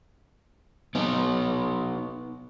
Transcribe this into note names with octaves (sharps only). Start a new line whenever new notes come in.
B3 D#4